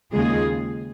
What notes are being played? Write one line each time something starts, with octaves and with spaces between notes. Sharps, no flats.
D#2 C#3 G#3 F4 G#4